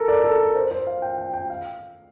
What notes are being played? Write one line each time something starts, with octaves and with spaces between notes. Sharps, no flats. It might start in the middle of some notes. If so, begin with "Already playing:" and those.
Already playing: A4 A#4
D5
A4
A#4
C5
C5
F5
G5
G5
G5
F5